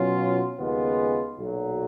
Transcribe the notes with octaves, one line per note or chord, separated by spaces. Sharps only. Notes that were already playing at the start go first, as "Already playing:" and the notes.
Already playing: B2 F#3 C#4 F4
D#2 C#3 G#3 B3 F4
B1 A#2 F#3